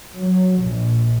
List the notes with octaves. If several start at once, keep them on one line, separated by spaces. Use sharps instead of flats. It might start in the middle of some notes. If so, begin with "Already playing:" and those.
F#3
A#1